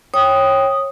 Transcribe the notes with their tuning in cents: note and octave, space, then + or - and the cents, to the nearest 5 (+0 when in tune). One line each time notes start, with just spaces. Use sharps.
C#5 -25 G5 +0 D#6 +0